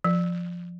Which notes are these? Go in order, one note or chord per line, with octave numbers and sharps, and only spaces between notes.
F3